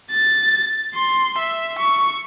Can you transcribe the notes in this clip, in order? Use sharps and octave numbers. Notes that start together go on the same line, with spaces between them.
A6
C6
E5
C#6